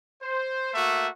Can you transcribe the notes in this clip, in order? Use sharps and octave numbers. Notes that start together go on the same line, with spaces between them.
C5
A3 A#3 F#4 E5